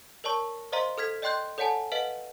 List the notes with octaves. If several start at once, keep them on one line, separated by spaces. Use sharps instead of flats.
A#4 C#5 D5 A5 C#6
C5 D5 D#5 F5 A#5 C6
A4 F6 G#6 B6
D5 D#5 G5 C6 F#6 G6
A4 C#5 D5 F#5 G#5 A5
B4 D#5 F5 F#5 D7